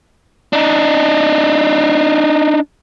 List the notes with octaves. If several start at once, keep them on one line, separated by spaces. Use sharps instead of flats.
D4 D#4